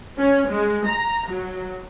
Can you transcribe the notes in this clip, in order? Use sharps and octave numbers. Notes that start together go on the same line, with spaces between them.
C#4
G#3
A#5
F#3